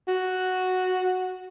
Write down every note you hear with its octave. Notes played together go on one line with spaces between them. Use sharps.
F#4